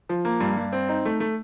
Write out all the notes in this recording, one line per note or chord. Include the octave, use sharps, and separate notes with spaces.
F3
A#3
G2
G2
C4
D#4
A3
A3